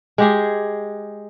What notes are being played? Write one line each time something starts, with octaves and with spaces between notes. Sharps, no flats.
G#3 G4 G#4